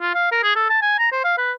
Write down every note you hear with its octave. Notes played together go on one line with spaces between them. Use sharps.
F4
F5
A#4
G#4
A4
A5
G#5
A#5
C5
F5
B4